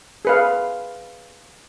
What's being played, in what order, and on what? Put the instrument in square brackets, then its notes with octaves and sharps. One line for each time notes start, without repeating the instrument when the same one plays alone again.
[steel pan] G#4 B4 F5